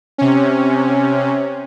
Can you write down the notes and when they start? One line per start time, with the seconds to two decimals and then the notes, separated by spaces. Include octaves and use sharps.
0.18 C3 C#4